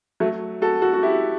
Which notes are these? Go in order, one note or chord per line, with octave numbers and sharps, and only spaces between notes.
F#3 A3
F#4 A4
F#4 A4
F#4
E4 G4